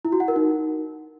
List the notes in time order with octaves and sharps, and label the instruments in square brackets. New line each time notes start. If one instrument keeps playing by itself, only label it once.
[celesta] E4
F#4
F#5
A#4
D#4